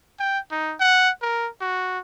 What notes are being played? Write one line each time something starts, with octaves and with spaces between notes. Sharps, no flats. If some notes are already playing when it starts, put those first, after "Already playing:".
G5
D#4
F#5
A#4
F#4